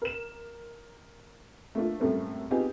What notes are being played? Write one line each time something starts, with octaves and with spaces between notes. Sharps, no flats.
A#4 E7
A3 A#3 D4 F4
F#2 A2 G3 A3 A#3 C4
B3 C4 D#4 F4 G4 G#4